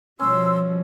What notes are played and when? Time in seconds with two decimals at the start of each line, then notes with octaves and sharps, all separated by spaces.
0.20 B2 F3 G3 C#4 C6 E6